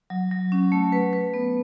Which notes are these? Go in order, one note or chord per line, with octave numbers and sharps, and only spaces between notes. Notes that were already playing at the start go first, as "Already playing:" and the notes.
F#3
F#3
C#4
A3
B4
B4
B3